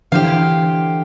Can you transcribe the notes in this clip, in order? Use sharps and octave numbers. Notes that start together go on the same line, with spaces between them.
D3 E3 G4 C5 F5